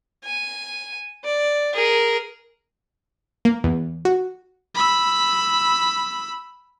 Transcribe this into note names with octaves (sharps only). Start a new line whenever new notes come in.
G#5
D5
G#4 A#4
A#3
E2
F#4
B5 E6